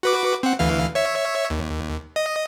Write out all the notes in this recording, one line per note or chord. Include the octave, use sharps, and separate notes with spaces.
F#4 B4 D6
C4 F#5
D2 E3 F5
C#5 E5
D#2
D#5